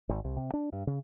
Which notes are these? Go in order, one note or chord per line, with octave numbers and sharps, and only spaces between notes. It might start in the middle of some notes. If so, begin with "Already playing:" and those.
G#1
C2
C3
D4
G2
C#3